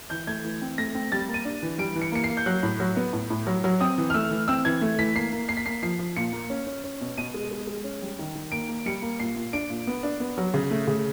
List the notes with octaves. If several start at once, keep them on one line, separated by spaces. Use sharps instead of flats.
E3 G6
A3 G#6
E3
C4
A3 A#6
C4
G3 A6
A#3
D#7
D4
E3
G3 D7
E3
C#7
A#3 C#7
C7
A#3
G6
F#3 F#6
A2
F#3
B3
A2
A2
F#3
F#3
C4 D#6
E3
F6
A3 E6
E3
C4 E6
E3 G#6
A3
E3 B6
A#3 C7
A#3
A#3 C7
B6
A#3 C7
F3 C7
F3
A#2 C#7
A#3
C#4
C#4
C#4
B2
B2 D#7
G#3
G#3
G#3
C#4
G3
D#3
D#3
A#3 D7
A#3
G3 C#7
A#3
A#2 C7
A#2
D4 D7
A#2
B3
D4
B3
F#3
C#3
A3
C#3